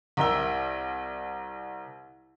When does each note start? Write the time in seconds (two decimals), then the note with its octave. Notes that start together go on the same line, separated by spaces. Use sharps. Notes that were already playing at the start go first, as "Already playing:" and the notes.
0.17 C2 A#4 E5 G5 E6 G7